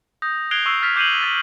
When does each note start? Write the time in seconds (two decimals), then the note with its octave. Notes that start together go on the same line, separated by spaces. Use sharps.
0.22 D#6 G6 A#6
0.51 F#6 G#6 C7 D7 F7 G7
0.66 C#6 E6 C7
0.82 F6 A6 B6 F7
0.96 D6 G6 C7 D#7 F7 F#7
1.21 E6 A6 B6